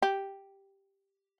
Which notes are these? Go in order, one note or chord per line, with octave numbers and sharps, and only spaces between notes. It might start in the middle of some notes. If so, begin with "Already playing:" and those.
G4